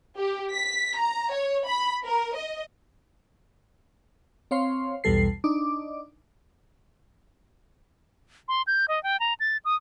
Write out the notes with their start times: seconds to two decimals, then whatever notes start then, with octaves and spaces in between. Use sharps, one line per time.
0.17 G4
0.52 B6
0.98 A#5
1.31 C#5
1.67 B5
2.05 A#4
2.35 D#5
4.51 C4 C#5 F5 C6
5.04 B1 E2 B2 G3 A4 C7
5.44 D4 D#4 D6
8.48 C6
8.67 G6
8.88 D#5
9.03 G5
9.20 A#5
9.40 A6
9.65 D#6